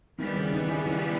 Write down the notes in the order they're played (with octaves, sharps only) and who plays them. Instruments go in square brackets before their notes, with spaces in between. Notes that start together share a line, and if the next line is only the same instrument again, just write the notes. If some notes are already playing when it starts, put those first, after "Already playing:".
[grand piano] D#3 D#4 [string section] E3 G3 B3
[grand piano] C#3 C#4
C#4
D#3 D#4
D#4
C#3 C#4
D#3 D#4